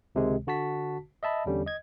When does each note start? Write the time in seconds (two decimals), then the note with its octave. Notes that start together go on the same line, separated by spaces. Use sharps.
0.15 C#2 C3 D#3 G#3
0.47 D3 F#4 A5 B6
1.23 D#5 E5 A5 B5
1.46 E2 D3 G3 C#4
1.66 D#5 G#6